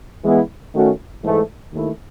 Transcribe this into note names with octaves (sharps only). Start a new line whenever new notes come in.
E3 G#3 B3 E4
D#3 A3 C#4 F#4
G#2 E3 A3
D#2 D#3 A3 E4